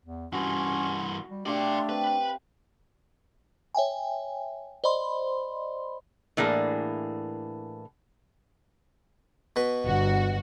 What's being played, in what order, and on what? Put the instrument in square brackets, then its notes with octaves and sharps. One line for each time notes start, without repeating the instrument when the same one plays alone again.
[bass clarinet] E2
[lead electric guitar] G2 E3 [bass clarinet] C#4 [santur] F#4 [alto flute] C6
[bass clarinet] G3
[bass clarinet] A3 [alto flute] D4 [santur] G4 E5 F5 [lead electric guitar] D5 C6
[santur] C4 [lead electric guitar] B4
[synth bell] C#5 E5 G5 G#5
C5 D5 D#5 B5 C6
[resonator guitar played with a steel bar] A2 E3 A#3 D4 G#4
[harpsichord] B2 B4
[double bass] G1 [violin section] F#4